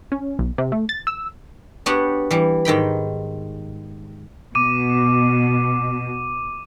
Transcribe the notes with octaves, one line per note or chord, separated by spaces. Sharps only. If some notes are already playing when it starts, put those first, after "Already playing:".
C#4
B1
C3
A3
A6
E6
B3 D4 F#4 G4 C#5 F#5
E3 G3
G#2 D#3 G5 B5
B2 D6 D#7